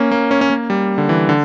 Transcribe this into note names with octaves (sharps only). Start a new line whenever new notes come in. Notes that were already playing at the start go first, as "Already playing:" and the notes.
Already playing: A#3 C#4
A#3
C#4
C#4
A#3
G3
D3
E3
D3